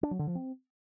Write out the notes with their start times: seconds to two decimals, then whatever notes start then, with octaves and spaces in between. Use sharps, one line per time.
0.03 D4
0.11 F#3
0.19 D3
0.27 F3
0.35 C4